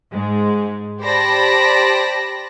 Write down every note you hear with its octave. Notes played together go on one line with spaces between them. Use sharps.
G#2 G#3
G4 C5 D5 A5 B5 A#6